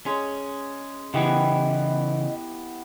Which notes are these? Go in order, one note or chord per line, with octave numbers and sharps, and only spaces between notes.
G#3 C#4
C#3 E3 B3 E4 G4 D#5